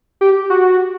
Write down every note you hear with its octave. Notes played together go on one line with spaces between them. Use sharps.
G4
F#4